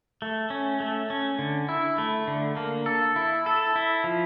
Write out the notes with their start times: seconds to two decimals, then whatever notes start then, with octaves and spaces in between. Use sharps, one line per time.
0.22 A3
0.50 C#4
0.80 A3
1.10 C#4
1.39 D3
1.69 E4
1.98 A3
2.28 D3
2.57 A#3
2.86 A4
3.16 E4
3.46 A4
3.76 E4
4.04 F3